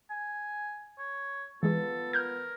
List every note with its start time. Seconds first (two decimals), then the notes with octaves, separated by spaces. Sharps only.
0.10 G#5
0.99 C#5
1.63 E3 G#3 B3 F4 A4 B4
2.13 A#4 F6 G6 G#6